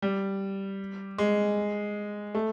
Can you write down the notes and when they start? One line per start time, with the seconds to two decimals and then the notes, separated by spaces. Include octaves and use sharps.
0.02 G3
1.18 G#3
2.35 A3